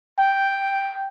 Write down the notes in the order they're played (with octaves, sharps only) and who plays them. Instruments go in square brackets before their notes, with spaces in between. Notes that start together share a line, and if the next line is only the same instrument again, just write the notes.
[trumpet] G5